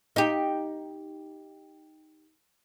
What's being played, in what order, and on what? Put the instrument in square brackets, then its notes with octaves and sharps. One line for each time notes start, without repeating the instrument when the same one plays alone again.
[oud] D#4 G4